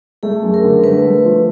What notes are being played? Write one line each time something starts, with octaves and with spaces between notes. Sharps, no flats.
A3 G#4
F#2
A#4
D3
A3 B4
A3
F3